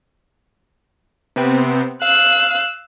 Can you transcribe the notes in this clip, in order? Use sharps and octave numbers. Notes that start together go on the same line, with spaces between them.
C3 B3 C4
F5 E6 F#6